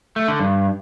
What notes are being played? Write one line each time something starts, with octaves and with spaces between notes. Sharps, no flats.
A3
D3
G2